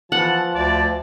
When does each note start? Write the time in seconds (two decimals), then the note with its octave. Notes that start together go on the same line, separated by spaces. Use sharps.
0.12 E3 F3 F#5 A5
0.55 D2 D5 A5